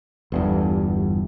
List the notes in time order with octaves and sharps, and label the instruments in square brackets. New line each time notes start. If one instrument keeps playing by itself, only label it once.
[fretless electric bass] G1 E2 G2